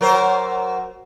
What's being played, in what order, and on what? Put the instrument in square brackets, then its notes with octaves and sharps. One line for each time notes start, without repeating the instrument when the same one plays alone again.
[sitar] F#3 A#4 C5